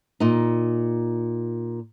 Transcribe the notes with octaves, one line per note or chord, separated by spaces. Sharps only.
A#2 D#4